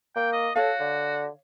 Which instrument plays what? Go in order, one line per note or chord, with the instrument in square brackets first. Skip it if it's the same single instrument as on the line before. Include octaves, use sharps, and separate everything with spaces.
[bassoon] A#3 [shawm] G5
[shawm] D#5
[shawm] F#4 [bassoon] A4 [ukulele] C#5 F5
[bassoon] D3